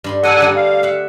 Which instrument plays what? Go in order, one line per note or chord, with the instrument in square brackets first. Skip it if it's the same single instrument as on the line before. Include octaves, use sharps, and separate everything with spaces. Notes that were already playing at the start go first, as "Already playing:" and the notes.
[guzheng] G2 B5 C6
[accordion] A4 F#5 G#5 [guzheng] A#4 D5 D#5
[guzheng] D3 G3 A3
[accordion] F5
[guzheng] E5 F#5